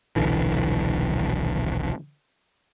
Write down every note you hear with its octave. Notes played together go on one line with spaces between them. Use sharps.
D#1 B1 D3 E3